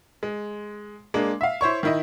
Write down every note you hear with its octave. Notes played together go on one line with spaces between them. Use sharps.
G#3
G#3 A#3 D4
E5 F5
E4 C5 C#5 C#6
D#3 E4 D#5